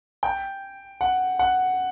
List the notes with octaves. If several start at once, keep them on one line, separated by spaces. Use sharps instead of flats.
G5
F#5
F#5